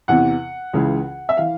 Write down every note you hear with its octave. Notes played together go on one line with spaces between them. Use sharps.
E2 C3 E3 F#5
C#2 C#3 E3
E5
E3 F5